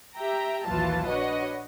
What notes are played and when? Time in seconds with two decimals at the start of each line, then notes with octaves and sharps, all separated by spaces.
0.17 G4 E5 G5 A#5
0.67 A#1 D#2 E3 F#3 F4 A5
1.10 D4 F#4 B4 C#5 D#5